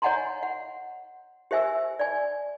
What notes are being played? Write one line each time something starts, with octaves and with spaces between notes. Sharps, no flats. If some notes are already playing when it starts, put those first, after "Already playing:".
C#5 D#5 F#5 G#5 A#5 C6
F#5
G4 C5 E5 G#5 E6
D5 G#5